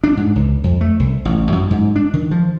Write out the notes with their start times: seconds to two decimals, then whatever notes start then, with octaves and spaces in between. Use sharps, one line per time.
0.04 D4
0.17 G#2
0.36 C#2
0.64 F2
0.81 A3
1.00 C2
1.25 A1
1.52 F#2
1.71 G#2
1.96 D4
2.13 D#3
2.31 F3